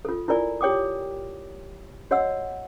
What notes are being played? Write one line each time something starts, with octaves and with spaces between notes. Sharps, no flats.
F4 A4
E4 F4 A#4 D5 G#5
G4 C#5 G5 D6 D#6
F#4 C#5 D#5 F#5 E6